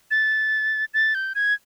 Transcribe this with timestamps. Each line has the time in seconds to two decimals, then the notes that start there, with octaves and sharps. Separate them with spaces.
0.11 A6
0.94 A6
1.15 G6
1.35 G#6